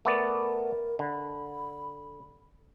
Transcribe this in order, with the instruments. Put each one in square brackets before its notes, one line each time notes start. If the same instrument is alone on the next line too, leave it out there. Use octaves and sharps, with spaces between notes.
[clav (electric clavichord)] A3 B3 D5 [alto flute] A#4
[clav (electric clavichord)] D3 [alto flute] B5